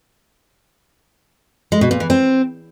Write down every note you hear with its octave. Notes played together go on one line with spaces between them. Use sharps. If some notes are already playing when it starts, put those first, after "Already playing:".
G#3
B2
A#2
E3
C4